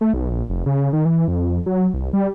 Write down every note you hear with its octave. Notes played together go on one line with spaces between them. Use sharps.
A3
B1
A#1
F1
C#3
D#3
E3
F2
F#3
C2
G3